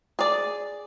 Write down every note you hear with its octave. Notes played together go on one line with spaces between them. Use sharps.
G#4 D5